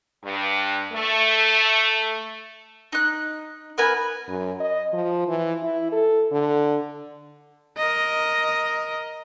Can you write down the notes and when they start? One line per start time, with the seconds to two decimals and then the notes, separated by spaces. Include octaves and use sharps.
0.24 G2
0.93 A3
2.92 D#4 F#6
3.78 B3 A#4 B4 G#5
4.28 F#2
4.60 D#5
4.93 F3
5.28 E3
5.63 E4
5.92 A4
6.32 D3
7.77 A#4 D#5